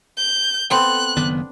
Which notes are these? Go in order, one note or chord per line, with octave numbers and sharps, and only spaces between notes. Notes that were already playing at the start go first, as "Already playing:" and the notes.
G6
B3 C4 A4 F#6
F#1 D#3 B3 D4